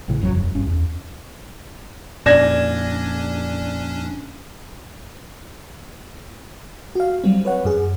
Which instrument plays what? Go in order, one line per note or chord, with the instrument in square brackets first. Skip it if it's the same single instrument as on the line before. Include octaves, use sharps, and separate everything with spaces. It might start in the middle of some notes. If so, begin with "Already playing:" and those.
[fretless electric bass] A1 A2 C#3 E3
G#1 F#2 F3 F#3
E1
G#1 G2 C#4
E2
[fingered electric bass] F2 A#2 [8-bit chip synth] C#4 D4 [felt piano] D5 [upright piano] G#6 A#6 E7
[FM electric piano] F#4 F5
F#3 G3 C4
B4 C#5 F#5
F#2 G#4